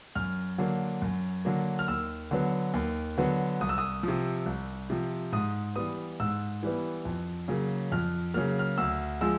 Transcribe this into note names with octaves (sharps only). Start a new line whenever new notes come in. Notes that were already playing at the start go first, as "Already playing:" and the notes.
F#2 F6
D3 F#3 A#3
F#2
D3 F#3 A#3
F6
D#2 E6
D3 F#3 B3
D#2
D3 F#3 B3
C2 D#6
E6
D#6
C3 F3
C2
C3 F3
G#2 D#6
E3 G3 B3 D#6
G#2 E6
E3 G3 B3
F2
C#3 F#3 A#3
F2 F6
C#3 F#3 A#3 F6
F6
D2 E6
F3 G#3 E6